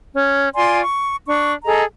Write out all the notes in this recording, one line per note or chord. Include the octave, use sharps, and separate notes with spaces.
C#4
F4 D5 G#5 C6
C#6
D4 C#6
G#4 A4 D#5 A#5